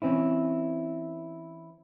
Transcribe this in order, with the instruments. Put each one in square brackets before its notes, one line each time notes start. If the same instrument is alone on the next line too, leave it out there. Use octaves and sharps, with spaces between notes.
[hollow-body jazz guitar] E3 C4 C#4 E4